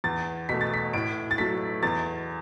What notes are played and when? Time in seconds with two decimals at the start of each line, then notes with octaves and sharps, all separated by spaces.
0.04 E2 A6
0.49 B2 A3 B6
0.61 A6
0.74 B6
0.93 A2 D7
1.31 A6
1.38 F#3 A3 B6
1.83 E2 A6